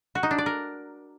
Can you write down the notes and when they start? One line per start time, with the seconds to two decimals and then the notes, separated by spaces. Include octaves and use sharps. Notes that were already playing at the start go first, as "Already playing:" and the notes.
0.15 F#4
0.23 D#4
0.31 D4
0.38 D5
0.46 A#4